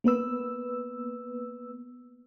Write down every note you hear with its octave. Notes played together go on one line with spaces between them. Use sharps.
A#3 B3 B4 E6